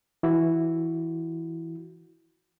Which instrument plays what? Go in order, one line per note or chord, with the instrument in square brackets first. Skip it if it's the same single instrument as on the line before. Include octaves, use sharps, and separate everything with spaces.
[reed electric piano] E3 E4 F#4